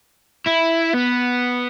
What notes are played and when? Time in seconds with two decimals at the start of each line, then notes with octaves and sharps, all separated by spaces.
0.47 E4
0.94 B3